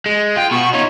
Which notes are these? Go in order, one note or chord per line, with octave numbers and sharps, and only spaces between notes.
G#3
F4 G5
B2 F#4 C#6
D#4 F4 C#5